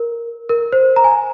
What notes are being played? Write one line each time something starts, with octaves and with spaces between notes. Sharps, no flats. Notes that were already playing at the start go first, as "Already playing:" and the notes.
Already playing: A#4
A#4
C5
A#5
G#5
A#5